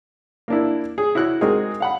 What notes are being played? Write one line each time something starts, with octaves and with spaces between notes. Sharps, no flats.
A#3 D4 E4
G#4
E4 F#4 C#5 F#6
G#3 C4 D#4 F#4 G#4 A#4
F5 F#5 B5